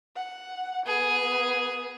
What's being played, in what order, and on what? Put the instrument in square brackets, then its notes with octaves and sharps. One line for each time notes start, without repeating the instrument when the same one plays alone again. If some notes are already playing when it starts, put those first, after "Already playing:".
[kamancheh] F#5
[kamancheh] B3 [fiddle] G#4